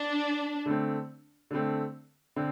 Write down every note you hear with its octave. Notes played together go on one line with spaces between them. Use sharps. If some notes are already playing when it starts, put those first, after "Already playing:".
Already playing: D4
D3 A3 C4
D3 A3 C4
D3 C4